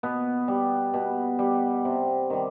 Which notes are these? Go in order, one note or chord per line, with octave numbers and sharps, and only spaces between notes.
B2 B3
G3
B2
G3
C3
D#3 G3